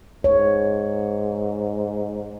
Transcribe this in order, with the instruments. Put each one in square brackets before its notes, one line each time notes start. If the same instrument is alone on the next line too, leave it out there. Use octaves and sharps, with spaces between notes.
[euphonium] G#2 [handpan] C#5